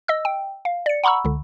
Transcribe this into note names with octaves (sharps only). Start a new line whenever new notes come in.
D#5 E6
G5
F5
D5 C#7
F#5 A#5 B5 C#6 E6
C#2 D3